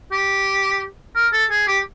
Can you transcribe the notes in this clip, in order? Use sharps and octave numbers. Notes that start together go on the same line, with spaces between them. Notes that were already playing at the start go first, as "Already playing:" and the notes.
G4
A#4
A4
G#4
G4